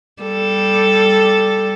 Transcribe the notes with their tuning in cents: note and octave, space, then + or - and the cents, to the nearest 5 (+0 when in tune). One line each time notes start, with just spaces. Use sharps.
G3 +0 A4 +0